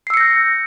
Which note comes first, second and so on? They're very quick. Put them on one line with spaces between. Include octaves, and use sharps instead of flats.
C7 E6 C#7 A#6 G6